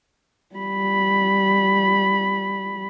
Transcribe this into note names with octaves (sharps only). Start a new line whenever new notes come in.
G3 B5